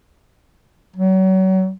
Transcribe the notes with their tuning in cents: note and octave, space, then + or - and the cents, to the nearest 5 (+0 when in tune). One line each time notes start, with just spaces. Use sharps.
F#3 +35